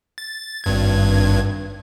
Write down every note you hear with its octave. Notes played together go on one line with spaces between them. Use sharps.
A6
G#1 G2 G#6